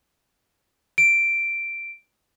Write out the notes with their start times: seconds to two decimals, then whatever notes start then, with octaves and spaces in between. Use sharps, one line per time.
0.98 D7